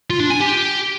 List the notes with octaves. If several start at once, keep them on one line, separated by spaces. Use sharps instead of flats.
F4
D4
G#5
G4